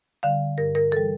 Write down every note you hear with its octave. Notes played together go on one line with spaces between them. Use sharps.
D3 G3 F5
G2 A#4
A#4
E3 G3 A4